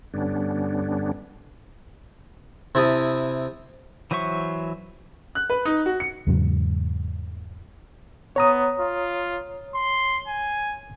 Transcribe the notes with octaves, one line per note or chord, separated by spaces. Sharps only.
G2 D3 G3 B3 C#4 D4
C3 E4 A5 D#6
E3 F#3 C5 E5 C#6
F#6
B4
D#4
F#4
C#7
E2 G#2 C#3 F#3
B3 C#5 A#5 D#6
F4
C6
G#5